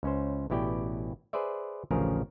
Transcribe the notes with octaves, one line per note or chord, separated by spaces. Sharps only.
C#2 C#4 C5
A1 B2 E4 G4 D5 G5
G#4 B4 C5 D5 E5
A1 D2 C#3 F3 G#4 A#4